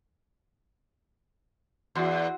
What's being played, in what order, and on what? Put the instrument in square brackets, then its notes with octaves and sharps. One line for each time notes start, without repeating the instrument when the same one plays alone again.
[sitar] E2 [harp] E4 F#4 C6